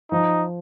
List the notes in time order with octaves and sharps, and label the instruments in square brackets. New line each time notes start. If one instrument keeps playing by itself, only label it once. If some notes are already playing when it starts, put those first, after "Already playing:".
[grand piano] F3 [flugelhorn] D#4